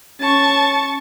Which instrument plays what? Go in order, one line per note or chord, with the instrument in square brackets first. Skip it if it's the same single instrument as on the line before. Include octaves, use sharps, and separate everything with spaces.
[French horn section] C#4 [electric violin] A5 C#6